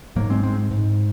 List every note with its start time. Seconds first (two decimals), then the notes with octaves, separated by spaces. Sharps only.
0.16 G#2 F#3 A#3
0.30 G#3 C4
0.43 G#3 C4
0.71 G#2